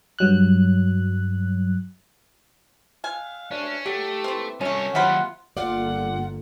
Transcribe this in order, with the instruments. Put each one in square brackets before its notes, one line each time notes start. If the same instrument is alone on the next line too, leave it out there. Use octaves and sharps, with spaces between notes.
[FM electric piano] G2 F#3 F#6
[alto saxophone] F5 [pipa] G#5
[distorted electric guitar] C#4 [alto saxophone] D4
[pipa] F#3 [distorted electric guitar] A3 [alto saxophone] G4
[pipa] E3 C4
[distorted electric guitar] C2 C#5 [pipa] A3 G#5 [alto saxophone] C#4
[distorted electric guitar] D#2 F#3 [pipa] C3 F4 B5 [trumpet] F#5
[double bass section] G1 D3 A#3 [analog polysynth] F4 [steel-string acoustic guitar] D5 F5 [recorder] F#5